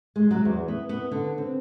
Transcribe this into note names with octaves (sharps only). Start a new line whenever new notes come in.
G#3
F#3
E2
B3
B3
D3
C4